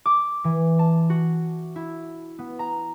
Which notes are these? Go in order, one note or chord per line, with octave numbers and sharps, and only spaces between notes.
D6
E3
A5
F#4
E4
B3
A#5